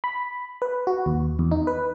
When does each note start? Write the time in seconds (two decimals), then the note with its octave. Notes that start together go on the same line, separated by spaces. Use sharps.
0.04 B5
0.62 B4
0.87 F#4
1.06 D#2
1.39 E2
1.51 D#4
1.67 B4